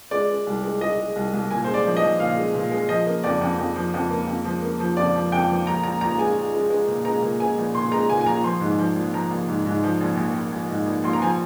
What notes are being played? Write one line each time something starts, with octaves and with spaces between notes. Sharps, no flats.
G#3 D5
G#3
C2
G#3
G#3 D#5
G#3
C2
C2
A#2 G#5
G#3 C5
D5
F3
D#5
F3
A#2 F5
G#3
A#2
G#3
F3 D#5
A#3
F2 D5
F2
F2
F3
F2
A#3
F2
F3
A#3
F3
F2 D5
F3
F2 G5
F3
A#1 A#5
A#1 A#5
A#1 A#5
G#3 G#5
G#3
G#3
G#3
A#2
G#3 A#5
A#2
G#3 G#5
A#1
A#2 C6
G#3 A#5
A#2 G#5
G#5
A#1 A#5
F3 C6
G#2
F3
A#1
F3 A#5
A#1
G#2
G#2
F3
A#1
A#1
A#1
A#1
G#2
A#1
A#1 C6
A#5
F3 G#5